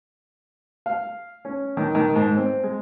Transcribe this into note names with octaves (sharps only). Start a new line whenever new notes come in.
F5
C#4
D#3
D#3
G#2
C4
G#3